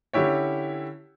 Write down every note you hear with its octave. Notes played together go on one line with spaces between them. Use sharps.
D3 C#4 E4 G4 C#5